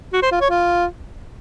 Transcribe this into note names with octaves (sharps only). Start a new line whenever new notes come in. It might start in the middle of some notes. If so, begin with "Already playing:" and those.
F#4
C5
F4
C#5
F4